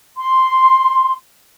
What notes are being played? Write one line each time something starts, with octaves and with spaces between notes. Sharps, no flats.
C6